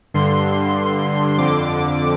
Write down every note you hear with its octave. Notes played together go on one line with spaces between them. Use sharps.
G2 D3 C6
F2 D3 D6